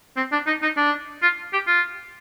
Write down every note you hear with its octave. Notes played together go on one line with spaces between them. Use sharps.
C4
D4
D#4
D#4
D4
F4
G4
F4